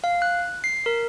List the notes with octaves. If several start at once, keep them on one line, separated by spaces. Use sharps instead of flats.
F5
F#6
C7
A#4